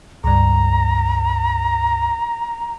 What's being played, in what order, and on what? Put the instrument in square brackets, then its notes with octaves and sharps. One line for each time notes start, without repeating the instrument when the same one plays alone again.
[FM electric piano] C#2 G2 [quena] A#5